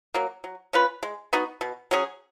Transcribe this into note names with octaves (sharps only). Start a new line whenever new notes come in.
F#3 A#3
F#3
C#4 F4 B4
G#3
B3 D#4 F#4
B2
F#3 C#4 G#4